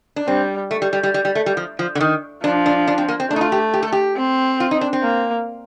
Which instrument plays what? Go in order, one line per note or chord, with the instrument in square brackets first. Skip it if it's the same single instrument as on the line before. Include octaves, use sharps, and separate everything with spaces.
[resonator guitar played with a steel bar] D4
[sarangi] G3 [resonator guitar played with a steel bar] C4
[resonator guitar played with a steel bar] A3
G3
G3
G3
G3
G3
A3
G3
F3
F3
D3
D#3
[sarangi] F3 [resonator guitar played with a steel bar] D4
[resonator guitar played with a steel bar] D4
D4
C4
A#3
C4
[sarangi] A3 [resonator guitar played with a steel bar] D4
[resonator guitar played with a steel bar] D#4
F4
G4
G4
A4
G4
[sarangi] C4
[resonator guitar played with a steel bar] F4
D#4
D4
C4
[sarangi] A#3